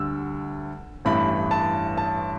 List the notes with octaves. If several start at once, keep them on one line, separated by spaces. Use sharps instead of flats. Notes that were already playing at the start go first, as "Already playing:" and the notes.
Already playing: D2 D3 G3 E6
A1 G2 E3 A3 B5
A5
A5